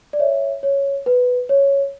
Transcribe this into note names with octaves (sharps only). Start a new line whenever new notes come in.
D5
C#5 E5
C#5
B4
C#5